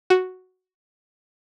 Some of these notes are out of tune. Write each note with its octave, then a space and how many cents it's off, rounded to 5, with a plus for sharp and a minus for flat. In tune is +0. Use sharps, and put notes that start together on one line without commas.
F#4 +0